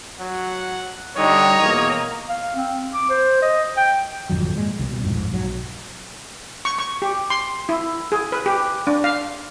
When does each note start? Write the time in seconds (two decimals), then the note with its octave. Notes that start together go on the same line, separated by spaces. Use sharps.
0.20 F#3 F#5
1.17 D3 G3 D#4 C#5 D#5 G5 A#5
1.62 E2 B2 A#3
2.29 F5
2.56 C4
2.94 D6
3.10 C5
3.42 D#5
3.78 G5
4.30 G#1 F2 D3 F#3
4.53 A#2 G#3
4.79 C2 B2 F3 G3
5.02 A#1 F2 G#2
5.30 B1 F#3
6.65 C#6
6.79 C#6
7.02 G4
7.30 C6
7.69 E4
8.12 G#4
8.32 B4
8.46 G4
8.87 D4
9.04 F5